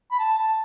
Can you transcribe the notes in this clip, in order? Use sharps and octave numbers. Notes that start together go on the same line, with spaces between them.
B5
A5
A5